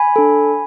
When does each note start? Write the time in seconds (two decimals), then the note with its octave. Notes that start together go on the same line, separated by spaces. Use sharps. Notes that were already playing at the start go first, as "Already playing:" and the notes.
Already playing: G#5 B5
0.16 D4 A4